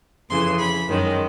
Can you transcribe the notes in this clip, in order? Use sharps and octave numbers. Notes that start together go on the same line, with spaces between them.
F2 C#3 E3 C6
B5
F#2 D#3 G#3 C#4